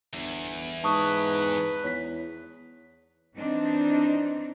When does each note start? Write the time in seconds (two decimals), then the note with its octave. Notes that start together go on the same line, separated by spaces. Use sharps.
0.13 G1 E2
0.84 G#2 B4 A5 C#6 D#6
1.84 E2 C#5 B6
3.36 E3 C4 D4 D#4